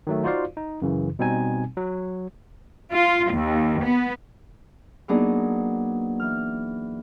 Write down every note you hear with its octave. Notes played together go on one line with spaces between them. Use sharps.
D#3 F#3 A3
D#4 F4 F#4 C5 D5 F5
D#4
F#2 C#3 E3
B2 G3 C4 D#4 G#5
F#3
F4
D#2
B3
F#3 A#3 B3 D4 D#4 G#4
E3 F6